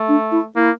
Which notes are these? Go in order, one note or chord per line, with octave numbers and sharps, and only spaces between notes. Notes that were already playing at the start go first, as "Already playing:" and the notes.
Already playing: A3
D4
E4
A#3 E4